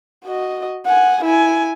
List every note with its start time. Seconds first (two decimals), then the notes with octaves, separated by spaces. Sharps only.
0.24 F#4 D#5
0.86 F#5 G#5
1.25 E4 G#5